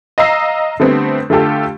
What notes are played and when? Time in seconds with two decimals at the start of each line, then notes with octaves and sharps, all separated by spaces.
0.18 D#5 F5 A#5 E6 C7
0.80 D3 G3 A3 B3 C4
1.30 D3 A3 F4 G4 A4